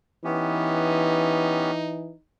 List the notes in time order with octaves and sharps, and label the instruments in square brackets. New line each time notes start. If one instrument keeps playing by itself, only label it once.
[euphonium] E3 [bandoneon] B3 C#4 G4 [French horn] D#4